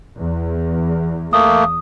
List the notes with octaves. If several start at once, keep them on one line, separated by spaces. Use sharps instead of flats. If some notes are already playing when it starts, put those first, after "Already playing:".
E2
A3 A#3 D#6